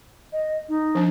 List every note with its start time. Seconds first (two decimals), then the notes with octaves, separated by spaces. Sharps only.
0.32 D#5
0.68 D#4
0.95 F3 D4